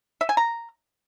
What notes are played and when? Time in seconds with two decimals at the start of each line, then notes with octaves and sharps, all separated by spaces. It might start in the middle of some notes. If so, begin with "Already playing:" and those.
0.21 E5
0.29 G#5
0.37 A#5